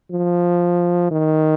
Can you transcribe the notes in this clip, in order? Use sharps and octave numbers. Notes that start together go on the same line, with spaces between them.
F3
D#3